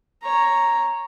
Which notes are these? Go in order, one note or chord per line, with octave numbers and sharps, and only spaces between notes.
C#5 A#5